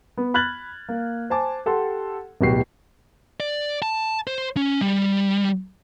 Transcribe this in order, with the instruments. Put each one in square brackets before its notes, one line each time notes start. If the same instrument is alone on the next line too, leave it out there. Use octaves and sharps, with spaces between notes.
[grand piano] B3
B5 F6 F#6 G#6 A6 F#7
A#3
C5 G#5 A5 D6
G4 A4 F#5 C6
D1 B2 F#3 F#4 G4 C7
[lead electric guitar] D5
A5
C5
C#4
G3